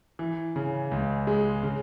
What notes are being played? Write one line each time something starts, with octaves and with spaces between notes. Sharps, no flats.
E3
C#3
C#2
G#3
C#3